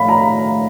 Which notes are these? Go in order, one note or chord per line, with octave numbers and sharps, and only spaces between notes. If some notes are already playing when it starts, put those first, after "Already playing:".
Already playing: A2 F5 B5
A#5